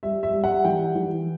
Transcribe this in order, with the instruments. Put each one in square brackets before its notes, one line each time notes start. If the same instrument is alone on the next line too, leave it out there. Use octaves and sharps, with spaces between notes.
[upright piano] G3 E5
E5
G3
F#5
E3 G5
E3